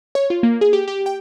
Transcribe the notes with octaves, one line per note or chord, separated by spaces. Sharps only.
C#5
F4
A#3
G#4
G4
G4
G5